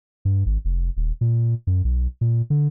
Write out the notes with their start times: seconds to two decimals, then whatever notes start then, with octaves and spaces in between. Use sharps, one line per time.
0.25 G2
0.46 G#1
0.65 F1
0.97 D#1
1.21 A#2
1.67 F#2
1.84 B1
2.21 A#2
2.50 D3